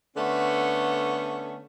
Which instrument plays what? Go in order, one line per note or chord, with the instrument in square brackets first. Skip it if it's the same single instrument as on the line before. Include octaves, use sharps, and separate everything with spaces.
[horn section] D3 A3 B3 C#4